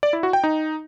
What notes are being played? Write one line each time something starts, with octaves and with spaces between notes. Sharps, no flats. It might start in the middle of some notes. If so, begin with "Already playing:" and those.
D5
E4
F#4
G5
D#4